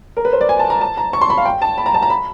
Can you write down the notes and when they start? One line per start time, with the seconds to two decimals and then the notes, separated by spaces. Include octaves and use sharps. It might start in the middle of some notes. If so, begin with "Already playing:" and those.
0.17 A#4
0.25 B4
0.33 C5
0.41 D5
0.49 G#5
0.59 A5
0.70 A#5
0.81 A5
0.97 A#5
1.13 C#6
1.21 C6
1.30 B5
1.38 F5
1.45 G5
1.62 A5
1.78 B5
1.86 A#5
1.94 A5
2.03 A#5
2.10 B5